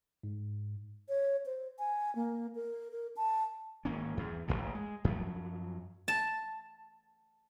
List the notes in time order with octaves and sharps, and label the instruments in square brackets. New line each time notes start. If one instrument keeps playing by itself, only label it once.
[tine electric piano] G#2
[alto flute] C#5
C5
G#5
A#3
A#4
A#4
A5
[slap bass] G#1 A#3 C#4
E2
E1 A1 F2 A#2
G#3
F#2 F3 F#3
[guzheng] A5